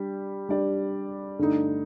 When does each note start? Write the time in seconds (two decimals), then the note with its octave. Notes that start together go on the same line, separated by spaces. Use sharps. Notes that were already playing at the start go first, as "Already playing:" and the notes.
Already playing: G3 D4 G4
0.49 G3 D4 G4 D5
1.39 G2 D3 A3 D#4